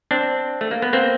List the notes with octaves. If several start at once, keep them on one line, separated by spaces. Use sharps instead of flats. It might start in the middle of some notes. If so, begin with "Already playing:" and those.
C4 D4
A3
A#3
B3
A#3 C4